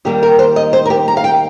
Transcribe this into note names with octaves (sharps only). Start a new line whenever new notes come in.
D#2 D#3 G3 A#3 G4
A#4
C5
D#5
C5
A#4
G4
A#5
F5
G5